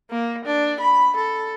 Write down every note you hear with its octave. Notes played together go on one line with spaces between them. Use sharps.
A#3
D4
B5
A4